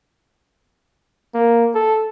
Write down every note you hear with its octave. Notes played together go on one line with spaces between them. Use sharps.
A#3
A4